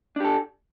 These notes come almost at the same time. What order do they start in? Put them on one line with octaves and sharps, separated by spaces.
D4 G4 A4